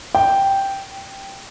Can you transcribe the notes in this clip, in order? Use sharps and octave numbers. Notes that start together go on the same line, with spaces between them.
G5